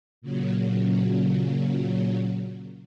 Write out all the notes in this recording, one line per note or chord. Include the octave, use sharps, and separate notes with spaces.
A#2 C#3 F#3